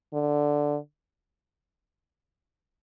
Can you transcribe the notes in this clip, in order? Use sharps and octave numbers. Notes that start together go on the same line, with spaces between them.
D3